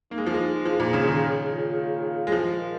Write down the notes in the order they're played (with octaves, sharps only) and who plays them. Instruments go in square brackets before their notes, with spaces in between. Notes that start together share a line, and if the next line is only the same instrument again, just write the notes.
[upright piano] A#3 [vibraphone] D#4
[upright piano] G#3
F3
[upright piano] G#3 [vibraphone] D#4
[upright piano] F3 [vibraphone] G#4
[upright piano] A#2
[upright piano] C#3 [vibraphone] G#4
[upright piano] D#3
[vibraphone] C#5
F4
F5
F5
[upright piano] G#3
[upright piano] F3 [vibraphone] D#5
[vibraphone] A#4